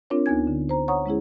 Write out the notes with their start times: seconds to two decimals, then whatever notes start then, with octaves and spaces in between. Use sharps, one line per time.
0.10 C4 D4 F4 A#4 C#5
0.26 D2 B3 D#4 G#5 G#6
0.47 D3
0.69 C5 A#5
0.88 C#5 F#5 A#5 C#6 D#6
1.06 G#3 C#4 E4 G#4